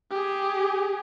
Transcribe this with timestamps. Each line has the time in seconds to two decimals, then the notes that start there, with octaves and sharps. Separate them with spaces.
0.11 G4 G#4